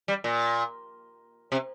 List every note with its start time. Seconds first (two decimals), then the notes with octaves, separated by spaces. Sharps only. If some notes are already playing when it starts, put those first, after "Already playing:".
0.08 G3
0.24 A#2
1.52 C3